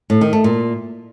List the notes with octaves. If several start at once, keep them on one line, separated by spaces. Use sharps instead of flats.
A2
D#3
A3
A#2